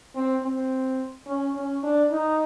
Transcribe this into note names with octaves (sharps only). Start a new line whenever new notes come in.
C4
C4
C#4
C#4
D4
D#4